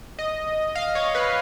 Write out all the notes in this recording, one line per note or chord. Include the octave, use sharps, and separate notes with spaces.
D#5
F5
C#5
B4